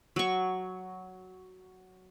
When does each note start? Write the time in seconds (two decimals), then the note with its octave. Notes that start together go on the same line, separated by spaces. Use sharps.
0.16 F#3 C#6